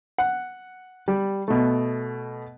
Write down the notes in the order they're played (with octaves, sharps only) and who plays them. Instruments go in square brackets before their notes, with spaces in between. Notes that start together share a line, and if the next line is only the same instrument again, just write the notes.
[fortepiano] F#5
G3
B2 A3